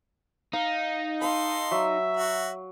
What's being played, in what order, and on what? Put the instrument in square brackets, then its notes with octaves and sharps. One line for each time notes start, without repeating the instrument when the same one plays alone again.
[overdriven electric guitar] D#4 [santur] F5
[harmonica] A4 C6 [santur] F5 B5
[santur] F#3 [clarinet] E5
[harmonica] F#4